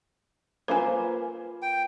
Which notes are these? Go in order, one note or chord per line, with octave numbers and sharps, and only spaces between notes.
A#3 F4 B4 C5 G#5
G5